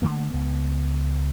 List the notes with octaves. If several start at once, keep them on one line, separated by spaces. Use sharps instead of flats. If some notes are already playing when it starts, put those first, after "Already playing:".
D3 E3 A3 A#3
C#2 B3